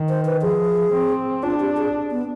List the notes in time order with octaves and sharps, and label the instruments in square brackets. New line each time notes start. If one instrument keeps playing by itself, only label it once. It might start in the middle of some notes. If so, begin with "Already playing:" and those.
Already playing: [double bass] D#3
[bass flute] C5
B4
[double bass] F3 [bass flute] G#4
[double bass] C4
[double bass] D4 [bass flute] F4
[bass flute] G4
G#4
B3